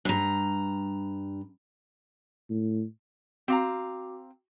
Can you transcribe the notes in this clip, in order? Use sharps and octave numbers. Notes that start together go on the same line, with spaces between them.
G2 A#5
A2
C4 F#4 F5 A#5 D6